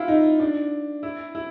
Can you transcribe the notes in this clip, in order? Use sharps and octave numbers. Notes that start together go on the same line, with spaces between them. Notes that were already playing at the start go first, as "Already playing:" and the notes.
Already playing: E4 F4
D#4
D4
E4
E4